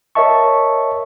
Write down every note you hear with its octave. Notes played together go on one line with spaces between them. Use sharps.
A#4 C#5 D#5 E5 A5 C#6